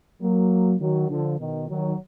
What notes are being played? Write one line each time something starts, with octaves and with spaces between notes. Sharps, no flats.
F#3 A#3
D#3 F#3
D3 F3
B2 D#3
D#3 F#3